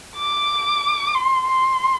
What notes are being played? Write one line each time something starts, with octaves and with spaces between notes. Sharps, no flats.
D6
C6
C6